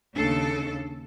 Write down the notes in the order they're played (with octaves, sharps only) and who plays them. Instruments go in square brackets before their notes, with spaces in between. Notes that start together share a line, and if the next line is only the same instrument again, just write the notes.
[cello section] D#2 C#3 A4 [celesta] D4 C7